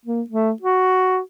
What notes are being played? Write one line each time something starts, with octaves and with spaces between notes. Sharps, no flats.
A#3
A3
F#4